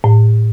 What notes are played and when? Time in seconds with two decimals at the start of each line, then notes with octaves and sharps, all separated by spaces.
0.04 A2